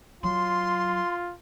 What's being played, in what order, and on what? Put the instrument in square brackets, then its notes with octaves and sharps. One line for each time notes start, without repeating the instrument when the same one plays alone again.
[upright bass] F#3 [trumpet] F4 [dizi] C6